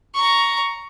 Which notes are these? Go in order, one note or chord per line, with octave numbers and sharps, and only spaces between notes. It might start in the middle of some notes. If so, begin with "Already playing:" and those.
A#5 C#6